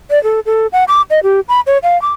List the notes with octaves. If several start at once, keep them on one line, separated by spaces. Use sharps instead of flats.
D5
A4
A4
F#5
D6
D#5
G4
B5
C#5
F5
D6